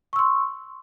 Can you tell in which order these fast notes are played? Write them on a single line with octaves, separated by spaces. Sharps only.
C#6 E6 C6